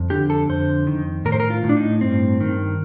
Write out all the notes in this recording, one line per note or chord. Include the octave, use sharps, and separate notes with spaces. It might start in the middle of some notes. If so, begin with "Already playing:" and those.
Already playing: F2
D3 G4
A4
F2 C5
D#3
A2 A#4
C5
A#4
F4
A2
D4
D#4
G2 C4
D#3